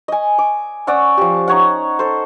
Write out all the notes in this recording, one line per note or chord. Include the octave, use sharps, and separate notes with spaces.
D#5 G#5
D6
C#4 D5 F#5 E6
F3 G4
D#4 C#5 F#5
A4 C5